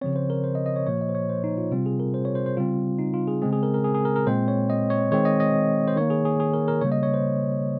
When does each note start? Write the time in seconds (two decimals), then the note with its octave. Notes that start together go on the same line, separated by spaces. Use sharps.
0.01 C#3 F3 C4 C#5
0.16 C5
0.30 A#4
0.44 C5
0.55 D#5
0.66 D#5
0.76 C#5
0.87 A#2 F3 A#3 C#5
1.01 D#5
1.09 C5
1.15 C#5
1.29 C5
1.44 D#4
1.58 F4
1.72 C3 G3 C4 F4
1.86 G#4
2.00 A#4
2.14 C5
2.25 C#5
2.35 C5
2.46 C5
2.57 C#3 G3 C4 F4
2.99 D#4
3.14 F4
3.28 G#4
3.42 C#3 G#3 C4 G#4
3.53 G#4
3.63 A#4
3.74 A#4
3.84 G#4
3.94 G#4
4.05 A#4
4.16 A#4
4.27 A#2 G#3 C4 C5
4.48 C#5
4.70 D#5
4.90 C#5
5.11 D#3 G#3 C4 C#5
5.25 D#5
5.40 D#5
5.88 C5
5.96 D#3 A#3 C#5
6.10 G#4
6.25 G#4
6.40 G#4
6.53 A#4
6.68 A#4
6.81 C#3 G3 A#3 C#5
6.92 D#5
7.03 C#5
7.14 C5